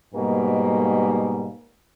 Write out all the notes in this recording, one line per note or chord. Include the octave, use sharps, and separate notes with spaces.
G#2 B2 G3 A#3